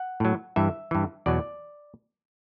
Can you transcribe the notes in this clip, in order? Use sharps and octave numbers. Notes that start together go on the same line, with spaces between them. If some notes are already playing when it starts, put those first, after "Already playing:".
Already playing: F#5
A2 F#3
G2 E3 E5
G2 E3
E2 B2 F#3 D5